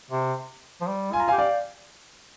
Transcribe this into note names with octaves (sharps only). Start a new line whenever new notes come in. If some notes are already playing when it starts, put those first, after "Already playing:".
C3
F3
G3
F4 G#5
A#5
F5 G#5
G4
D5 F5